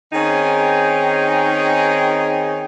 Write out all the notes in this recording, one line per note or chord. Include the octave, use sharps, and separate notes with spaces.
D#3 C4 C#4 D#4 G#4 G5